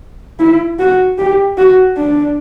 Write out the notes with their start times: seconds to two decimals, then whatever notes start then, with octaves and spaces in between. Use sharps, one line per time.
0.39 E4
0.79 F#4
1.18 G4
1.58 F#4
1.97 D4